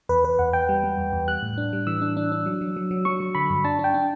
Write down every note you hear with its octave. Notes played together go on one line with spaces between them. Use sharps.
E2 B4
E2 B4
E2 F#5
E2 G5
G3
G3
E2
E2
G3 F#6
A2
D4
G3
E3 E6
D4
D4
D4
F#3
F#3
F#3
F#3
F#3 C#6
F#3
D3 B5
G2
D4 A5
D4
G5
D4